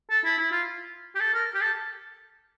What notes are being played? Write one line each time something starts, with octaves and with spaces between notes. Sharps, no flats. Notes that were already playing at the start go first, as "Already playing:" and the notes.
A4
E4
E4
F4
G4
A4
A#4
G4
A4